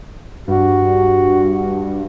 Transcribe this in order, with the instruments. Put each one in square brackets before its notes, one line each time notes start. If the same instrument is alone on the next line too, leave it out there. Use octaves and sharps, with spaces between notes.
[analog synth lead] G2 [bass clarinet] F#4